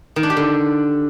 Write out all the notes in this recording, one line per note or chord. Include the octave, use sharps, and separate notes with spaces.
D#3
D4
G4
D3